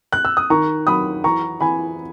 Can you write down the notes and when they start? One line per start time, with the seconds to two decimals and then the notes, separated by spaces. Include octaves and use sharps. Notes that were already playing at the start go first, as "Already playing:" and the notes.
0.13 F#6
0.25 E6
0.37 D#6
0.50 D#3 A#5 C#6
0.87 F#3 B5 D#6
1.24 E3 A#5 C#6
1.61 E3 G#5 B5